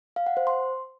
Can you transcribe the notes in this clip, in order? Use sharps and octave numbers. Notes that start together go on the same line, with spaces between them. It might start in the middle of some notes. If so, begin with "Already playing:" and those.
F5
F#5
C5
C6